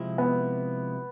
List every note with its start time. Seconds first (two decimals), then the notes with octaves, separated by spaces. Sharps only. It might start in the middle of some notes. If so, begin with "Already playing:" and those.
Already playing: C3 F3 G#3 C4 E4
0.18 B3